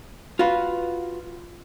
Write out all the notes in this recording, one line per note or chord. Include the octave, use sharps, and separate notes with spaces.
F4 F#4 B4